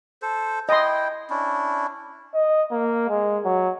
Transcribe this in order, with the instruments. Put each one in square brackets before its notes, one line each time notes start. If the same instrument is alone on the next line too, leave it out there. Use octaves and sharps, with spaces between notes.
[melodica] A4 C5
[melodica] E4 G5 [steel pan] D#5 C6
[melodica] C#4 D4 E4
[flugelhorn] D#5
A#3
G#3
F#3